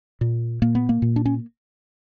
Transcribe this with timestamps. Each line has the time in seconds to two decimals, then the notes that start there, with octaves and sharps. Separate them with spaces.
0.21 A#2
0.62 A#2 A#3
0.75 B3
0.89 A#3
1.02 A#2
1.16 D4
1.26 C#4